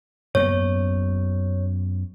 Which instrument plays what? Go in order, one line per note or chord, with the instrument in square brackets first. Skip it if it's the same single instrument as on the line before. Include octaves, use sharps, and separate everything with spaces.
[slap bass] F#2 A#3 B3 [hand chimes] C#5